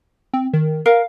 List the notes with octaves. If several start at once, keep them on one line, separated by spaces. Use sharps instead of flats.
C4
D#3
A#4 F5